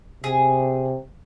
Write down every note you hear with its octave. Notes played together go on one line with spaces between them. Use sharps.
C3 G#4